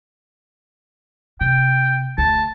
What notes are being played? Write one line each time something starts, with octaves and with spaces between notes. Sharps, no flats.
C3 G5
D2 A5